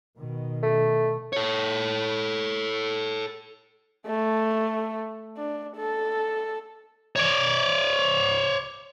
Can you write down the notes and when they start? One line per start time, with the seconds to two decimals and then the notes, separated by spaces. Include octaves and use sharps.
0.17 B2 D#3
0.63 A3
1.33 A4 C#5
4.07 A3
5.38 D4
5.76 A4
7.16 C#5 D5